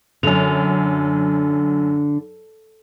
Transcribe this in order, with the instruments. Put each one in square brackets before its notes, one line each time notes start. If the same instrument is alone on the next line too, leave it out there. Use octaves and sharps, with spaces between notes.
[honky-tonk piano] F#2 F7 [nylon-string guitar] D3